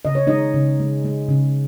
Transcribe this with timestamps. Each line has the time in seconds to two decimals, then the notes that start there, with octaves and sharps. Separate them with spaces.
0.05 C#3 D#5
0.15 C#5
0.27 G#3 D#4 D#5
0.54 C#3
0.80 G#3
1.05 G#3
1.29 C#3